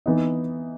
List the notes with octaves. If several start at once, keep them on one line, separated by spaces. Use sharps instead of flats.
E3 B3 D#4